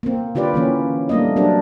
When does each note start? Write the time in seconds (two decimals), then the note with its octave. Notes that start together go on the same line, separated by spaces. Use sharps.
0.03 A#3 C4
0.35 D3 F4 G4 B4 D5
0.54 E3 A#3 C#4
1.09 G3 A3 A#3 D4 D#5
1.36 F#3 C4 D4 G4 A#4